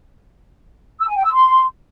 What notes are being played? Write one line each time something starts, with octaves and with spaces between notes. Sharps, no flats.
E6
G#5
G5
E6
C6